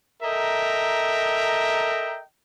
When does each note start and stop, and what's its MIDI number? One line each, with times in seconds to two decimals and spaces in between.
0.22 2.20 69
0.22 2.20 70
0.22 2.20 75
0.22 2.20 76
0.22 2.20 79
0.22 2.20 82